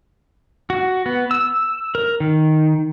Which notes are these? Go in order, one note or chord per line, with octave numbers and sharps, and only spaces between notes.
F#4
B3
E6
A#4
D#3